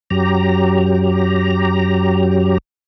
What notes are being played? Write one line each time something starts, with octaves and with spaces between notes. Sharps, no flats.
F#2 F#3 G4 A#5